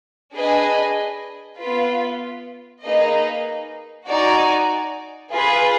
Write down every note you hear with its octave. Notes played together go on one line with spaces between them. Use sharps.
D4 G#4 B4 D#5 G#5
B3 F4 B4
A#3 D#4 G#4 B4 D#5
D#4 F#4 D5 G#5
F4 G#4 B4